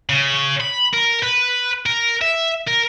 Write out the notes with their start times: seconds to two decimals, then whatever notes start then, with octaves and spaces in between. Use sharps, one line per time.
0.10 C#3
0.61 B5
0.94 A#4
1.23 B4
1.86 A#4
2.21 E5
2.67 A#4